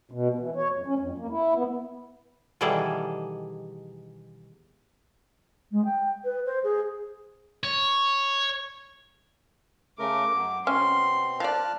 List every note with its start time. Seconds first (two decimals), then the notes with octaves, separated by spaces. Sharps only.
0.11 B2
0.38 E3
0.56 C#5
0.71 F2
0.86 C#4
0.98 F2
1.18 A#3
1.30 E4
1.55 B3
2.61 B2 D#3 E3 G3 G#4 A4
5.72 G#3
5.85 G5
6.24 B4
6.46 C5
6.64 G#4
7.63 C#5
9.99 C#3 A3 A#4 D6
10.34 F#2 F#3
10.67 B2 C4 C#4 C6
11.40 F3 D5 A5 F6 F#6